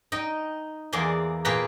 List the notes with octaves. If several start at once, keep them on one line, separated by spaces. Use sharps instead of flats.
D#4 D#5 G5
E2 A#3 G#4 D5 G#5 C6
A#2 F4 G#4 B4 G5 A#5